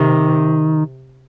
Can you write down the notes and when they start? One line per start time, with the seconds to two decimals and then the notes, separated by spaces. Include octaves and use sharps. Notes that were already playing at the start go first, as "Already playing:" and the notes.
Already playing: C3 D#3